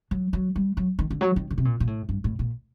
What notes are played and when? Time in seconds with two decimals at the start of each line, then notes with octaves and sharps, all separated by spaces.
0.11 F#3
0.33 F#3
0.56 G3
0.77 F#3
0.99 D#3
1.11 D3
1.21 F#3
1.36 D#3
1.51 D3
1.58 C3
1.65 A#2
1.80 A#2
1.87 A2
2.09 G2
2.24 A2
2.39 A#2